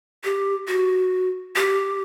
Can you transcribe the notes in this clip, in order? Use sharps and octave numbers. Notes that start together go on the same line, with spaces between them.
G4
F#4
G4